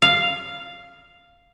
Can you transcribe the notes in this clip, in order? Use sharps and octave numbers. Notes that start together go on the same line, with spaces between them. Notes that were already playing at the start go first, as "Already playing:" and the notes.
F5